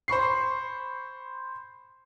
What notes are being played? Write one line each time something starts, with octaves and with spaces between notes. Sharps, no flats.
C5 B5 C#6 C7